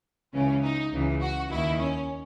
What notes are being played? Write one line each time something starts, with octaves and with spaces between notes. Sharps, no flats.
C#2 C#3 E3 C#4
D#4
C#2 C#3 E3
F#4
D#2 D#3 E4
C#4